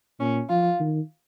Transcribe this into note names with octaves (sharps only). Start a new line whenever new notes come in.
A#2 C#4
F3 F4
D#3